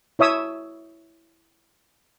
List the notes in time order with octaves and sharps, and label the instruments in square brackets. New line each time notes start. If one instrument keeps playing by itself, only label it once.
[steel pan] E4 C#5 E5 D#6 E6